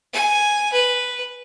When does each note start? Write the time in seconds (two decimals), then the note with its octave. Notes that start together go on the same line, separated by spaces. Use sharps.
0.13 G#5
0.72 B4